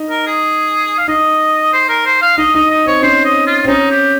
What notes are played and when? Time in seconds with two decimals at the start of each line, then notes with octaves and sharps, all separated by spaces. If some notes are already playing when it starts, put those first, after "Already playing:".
Already playing: D#4
0.10 A#4
0.26 G#4
0.98 F5
1.08 D#4 D#5
1.73 C5
1.89 A#4
2.06 C5
2.22 F5
2.38 D#4 D#5
2.54 D#4 D#5
2.70 D#5
2.86 C4 C#5
3.02 C#4 C5
3.25 D#5
3.47 F4
3.64 C4
3.68 C#4 D#4
3.90 G4